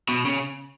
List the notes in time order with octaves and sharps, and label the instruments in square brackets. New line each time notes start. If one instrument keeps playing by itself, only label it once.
[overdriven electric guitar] B2
C#3